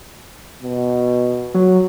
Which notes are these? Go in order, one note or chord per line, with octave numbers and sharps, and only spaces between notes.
B2
F#3